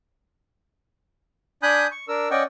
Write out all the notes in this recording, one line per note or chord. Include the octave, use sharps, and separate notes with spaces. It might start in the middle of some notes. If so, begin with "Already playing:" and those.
D4 G#5 B5 D#6 F#6 G6
C#6
D4 A#4 E6
C#4 D5 D#5 F#5 G5 C#6